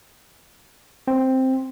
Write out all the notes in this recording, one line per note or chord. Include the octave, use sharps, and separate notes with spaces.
C4